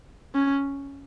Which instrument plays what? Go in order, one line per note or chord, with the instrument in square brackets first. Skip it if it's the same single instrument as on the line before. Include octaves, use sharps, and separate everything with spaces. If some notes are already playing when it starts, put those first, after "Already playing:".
[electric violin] C#4